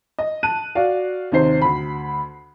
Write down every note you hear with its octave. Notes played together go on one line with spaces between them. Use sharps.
D#5
A5 F#6 D#7
F#4 D5 F5
D#2 C3 D#4 C5 C7
D2 B5